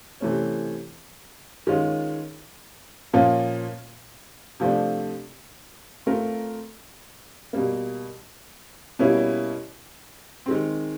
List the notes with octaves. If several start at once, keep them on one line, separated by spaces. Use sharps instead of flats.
C3 E3 A3 C#4
D#3 G#3 C#4 F4
A#2 F3 A#3 C#4 F4
C3 F3 A3 D4
A3 C4 F4 A#4
B2 G3 A#3
B2 G3 A#3 C#4 E4
D#3 G#3 C4